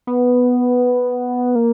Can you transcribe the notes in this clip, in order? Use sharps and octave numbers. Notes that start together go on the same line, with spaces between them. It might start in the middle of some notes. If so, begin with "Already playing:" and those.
B3
A#3